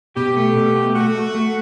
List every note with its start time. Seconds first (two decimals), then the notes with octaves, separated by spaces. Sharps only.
0.16 B2 G4
0.37 A3
0.56 B2
0.76 A3
0.95 A3 F#4
1.15 A3
1.34 A3